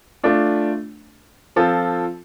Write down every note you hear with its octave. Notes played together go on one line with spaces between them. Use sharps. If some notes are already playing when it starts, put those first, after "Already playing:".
A3 D4 F4
F3 C4 F4 A4